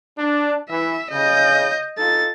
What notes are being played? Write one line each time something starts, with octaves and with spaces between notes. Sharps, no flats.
D4
E3 E5
C#3 D#5 G6
D#4 F4 A4 A6